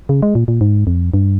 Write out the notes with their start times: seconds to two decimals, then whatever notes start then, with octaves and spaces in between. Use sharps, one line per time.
0.09 C#3
0.22 G#3
0.35 A#2
0.48 A#2
0.61 G#2
0.87 F2
1.14 G2